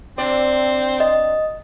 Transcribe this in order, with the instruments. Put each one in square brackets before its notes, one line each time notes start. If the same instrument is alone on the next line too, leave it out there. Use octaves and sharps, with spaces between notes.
[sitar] C3 D4 D5 [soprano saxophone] C4
[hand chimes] D#5